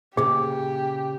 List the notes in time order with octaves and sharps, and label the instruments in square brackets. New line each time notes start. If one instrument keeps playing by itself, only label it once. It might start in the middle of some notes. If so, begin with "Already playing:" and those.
[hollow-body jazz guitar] A#2 C#3 [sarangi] G4 [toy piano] G#4